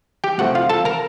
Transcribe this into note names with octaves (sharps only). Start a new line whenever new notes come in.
G4 G5
C3 F3 A3 F#4 F#5
F4 F5
A4 A5
A#4 A#5